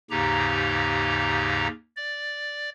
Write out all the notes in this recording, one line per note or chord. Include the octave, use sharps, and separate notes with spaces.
D#2 G#2 C#3 D#4 G4 A#5
D5